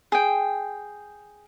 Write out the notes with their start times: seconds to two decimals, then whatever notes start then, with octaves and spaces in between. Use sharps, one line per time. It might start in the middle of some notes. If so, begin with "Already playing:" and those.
0.12 G#4 G5